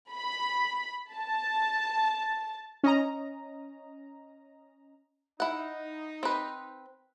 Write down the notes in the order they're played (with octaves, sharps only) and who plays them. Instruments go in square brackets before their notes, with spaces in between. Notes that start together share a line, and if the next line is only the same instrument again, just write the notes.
[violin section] B5
A5
[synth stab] C#4 D#5 A#5
[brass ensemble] D#4 [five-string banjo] E4 F#5
[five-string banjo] C4 B4